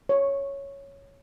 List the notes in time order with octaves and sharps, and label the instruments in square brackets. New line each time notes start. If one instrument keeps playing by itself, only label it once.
[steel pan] C#5